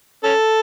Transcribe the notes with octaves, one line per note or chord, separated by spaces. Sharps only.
C#4 A4